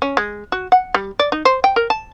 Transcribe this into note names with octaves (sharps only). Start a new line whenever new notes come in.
C#4
G#3
F#4
F#5
G3
D5
D#4
C5
G5
A#4
A5